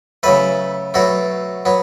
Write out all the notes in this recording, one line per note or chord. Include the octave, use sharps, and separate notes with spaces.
C#3 F#3 A3 B4
B2 F#3 A3 F#4
F#3 B3